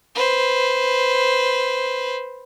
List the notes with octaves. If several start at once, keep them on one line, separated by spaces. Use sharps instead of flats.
B4 C5